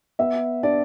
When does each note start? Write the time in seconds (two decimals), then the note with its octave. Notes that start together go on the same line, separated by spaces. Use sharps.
0.19 B3 E5
0.63 D4 D5